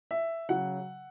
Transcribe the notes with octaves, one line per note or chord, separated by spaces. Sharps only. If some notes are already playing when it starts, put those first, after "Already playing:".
E5
C#3 F#3 F#5